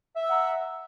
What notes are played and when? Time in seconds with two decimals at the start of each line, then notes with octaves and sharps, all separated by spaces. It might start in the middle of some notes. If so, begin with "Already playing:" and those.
0.16 E5
0.21 E6
0.26 F#5
0.31 A#5